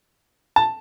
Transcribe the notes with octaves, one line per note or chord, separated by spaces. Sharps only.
A5